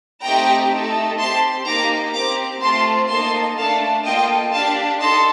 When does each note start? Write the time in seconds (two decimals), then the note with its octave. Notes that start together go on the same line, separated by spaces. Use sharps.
0.22 A3 C4 D#4 G4 G5 A#5
0.71 A3 D#4 A4
1.19 C4 G4 A5 C6
1.66 A#3 D#4 G4 A#5 D6
2.14 C4 G4 A#5 D6
2.62 A3 C4 F4 A5 C6
3.10 A#3 D#4 A4 A5 C6
3.57 A3 D4 A4 F5 A5
4.05 A#3 F4 A4 D#5 G5
4.54 D4 G4 F5 A5
5.01 D#4 A4 A5 C6